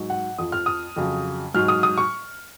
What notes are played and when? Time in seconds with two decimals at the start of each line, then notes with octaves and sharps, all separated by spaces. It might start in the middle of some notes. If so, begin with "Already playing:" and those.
Already playing: G#2 F#3
0.10 F#5
0.38 F2 F3 D#6
0.52 F6
0.66 D#6
0.96 F2 C#3 F#3
1.54 G#2 F#3 F6
1.68 D#6
1.83 D#6
1.98 C#6